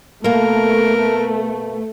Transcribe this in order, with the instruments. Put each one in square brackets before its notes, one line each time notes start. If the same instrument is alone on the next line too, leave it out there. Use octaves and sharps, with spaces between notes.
[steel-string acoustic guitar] B2 A#3 [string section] A3 [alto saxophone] A#4